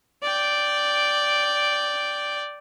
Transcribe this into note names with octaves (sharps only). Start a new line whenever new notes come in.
D5 G5